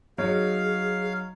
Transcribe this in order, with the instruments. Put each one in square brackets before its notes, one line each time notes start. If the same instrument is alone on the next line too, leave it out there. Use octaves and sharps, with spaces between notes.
[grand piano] F#3 D#4 C#5 [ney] G#4 [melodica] F5